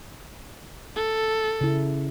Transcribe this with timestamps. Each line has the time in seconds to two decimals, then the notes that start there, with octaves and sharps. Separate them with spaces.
0.96 A4
1.61 C#3 E4